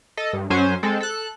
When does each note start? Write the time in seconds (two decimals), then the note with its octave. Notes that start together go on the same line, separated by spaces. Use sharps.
0.17 A4 D#5
0.33 G2
0.50 F#2 F#3 C#4 C5 G#5
0.83 G#3 C4 A4
1.00 A4 F#6